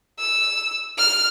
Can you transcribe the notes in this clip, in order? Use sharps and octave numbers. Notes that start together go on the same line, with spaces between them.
E6
F6